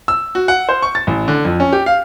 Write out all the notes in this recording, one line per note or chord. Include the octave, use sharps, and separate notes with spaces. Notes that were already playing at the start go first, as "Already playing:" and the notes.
E6
F#4
F#5
C5
C#6
A6
A1
D3
F2
C#4
G4
F5